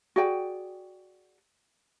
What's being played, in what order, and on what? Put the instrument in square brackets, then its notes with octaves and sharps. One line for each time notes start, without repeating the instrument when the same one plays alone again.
[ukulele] F#4 G#4 D5 G5